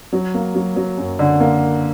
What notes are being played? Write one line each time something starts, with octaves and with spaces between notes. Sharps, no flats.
F#3
A#3
F#3
F#3
F#2
D3
A#3